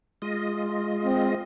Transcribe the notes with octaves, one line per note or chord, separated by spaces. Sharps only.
G#3 F4 D#5
C4